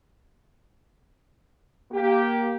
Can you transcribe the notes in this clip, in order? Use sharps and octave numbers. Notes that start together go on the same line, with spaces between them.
A#3 G4